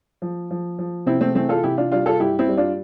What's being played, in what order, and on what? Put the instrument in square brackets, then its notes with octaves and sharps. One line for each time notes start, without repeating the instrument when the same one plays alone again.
[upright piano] F3
F3
F3
C3 C4 E4
A3 C4
E3 A3 C4
F4 A4
C3 E4 G4
D4 F4
G3 D4 F4
F4 A4
G2 E4 G4
C4 E4
G3
D4 F4